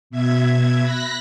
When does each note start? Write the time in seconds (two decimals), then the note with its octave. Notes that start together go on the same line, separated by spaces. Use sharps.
0.10 B2 E5 G#6
0.81 B5 F#6 A#6 B6